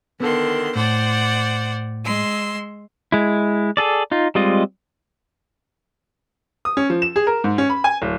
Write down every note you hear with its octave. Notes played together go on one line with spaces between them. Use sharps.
D3 D#3 B3 A4 C6
A2 C5 D5 F#5
G#3 C6 E6
G#3 E4
G#4 A4 D5
D#4 F4
G3 G#3 C4 F4 D#5
D#6
C#4
F3
E7
G#4
A#4
G#2
C#4
B5
G#5
D1